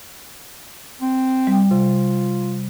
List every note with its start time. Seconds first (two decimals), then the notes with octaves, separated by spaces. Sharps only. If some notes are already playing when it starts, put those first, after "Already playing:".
1.01 C4
1.47 G3
1.71 C3 F4